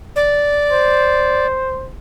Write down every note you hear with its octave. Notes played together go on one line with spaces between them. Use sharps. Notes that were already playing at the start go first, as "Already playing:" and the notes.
D5
C5